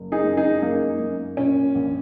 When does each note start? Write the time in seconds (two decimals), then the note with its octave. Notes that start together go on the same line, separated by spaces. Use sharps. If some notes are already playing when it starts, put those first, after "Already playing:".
Already playing: F#1
0.12 D#4 G#4
0.24 F#2
0.37 D#4 G#4
0.62 F#2 A#3 D#4
0.99 F#2
1.37 A#2 C#4
1.75 A#1